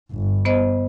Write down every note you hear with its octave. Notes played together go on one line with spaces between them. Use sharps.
G1
B3 C5 D#5